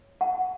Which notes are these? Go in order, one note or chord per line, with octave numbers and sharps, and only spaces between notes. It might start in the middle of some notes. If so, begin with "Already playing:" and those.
Already playing: C#5
F#5 A5